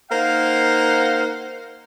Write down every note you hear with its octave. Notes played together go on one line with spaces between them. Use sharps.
A#3 D#4 A#4 C5 F5 F#5